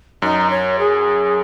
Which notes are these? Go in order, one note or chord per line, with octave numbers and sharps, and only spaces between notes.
F#2 D#4
C#5
G#4